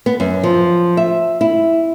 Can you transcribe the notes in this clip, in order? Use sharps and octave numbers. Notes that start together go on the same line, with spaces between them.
B3
F#2
F3
E5
E4